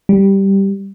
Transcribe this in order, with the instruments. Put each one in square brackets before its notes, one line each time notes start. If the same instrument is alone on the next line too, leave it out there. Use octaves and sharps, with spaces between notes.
[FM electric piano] G3